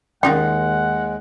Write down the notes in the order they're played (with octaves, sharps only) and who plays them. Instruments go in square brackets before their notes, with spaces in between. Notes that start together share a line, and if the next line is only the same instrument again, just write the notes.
[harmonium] D#2 G#3 [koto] D#3 D#4 F4 [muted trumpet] F#5 [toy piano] G5